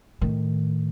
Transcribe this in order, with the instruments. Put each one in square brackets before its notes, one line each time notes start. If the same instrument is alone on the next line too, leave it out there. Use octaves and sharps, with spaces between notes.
[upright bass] A2 D#3